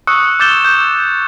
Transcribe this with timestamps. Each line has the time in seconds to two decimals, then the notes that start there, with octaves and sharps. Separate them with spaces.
0.07 C#6 D#6 E6 F#6 C#7
0.40 D6 G6 A6 E7 G7
0.65 G6